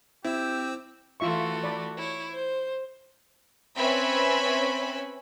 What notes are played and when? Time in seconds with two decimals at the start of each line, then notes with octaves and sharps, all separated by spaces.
0.24 C4 E4 G4 E6
1.20 E3 A3 F4 F#4 E5 C#6
1.64 D5 B5
1.97 E4 C#5
2.32 C5
3.77 C4 C#4 B4 E5 G#5 B5